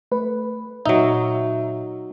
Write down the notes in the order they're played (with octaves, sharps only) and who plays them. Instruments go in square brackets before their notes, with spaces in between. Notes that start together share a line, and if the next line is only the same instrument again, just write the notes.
[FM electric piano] A3 B4
[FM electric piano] A#2 E5 [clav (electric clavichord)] F#3 D#4